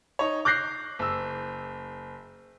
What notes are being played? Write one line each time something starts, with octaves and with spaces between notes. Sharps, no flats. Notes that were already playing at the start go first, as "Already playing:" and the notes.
D#4 C#5
D6 F#6 G6 A#6 C7
F#1 E6